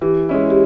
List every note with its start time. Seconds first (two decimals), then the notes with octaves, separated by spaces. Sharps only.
0.01 E3 G4
0.29 G#3 C#4 E4
0.50 G4